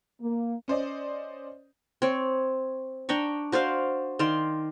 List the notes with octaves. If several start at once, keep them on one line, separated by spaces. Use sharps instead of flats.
A#3
C#4 C5 D5 D#5
C4 C#5
D4 G5 A#5 C#6
F#4 C5 D5 F5
D#3 D5 F5 C6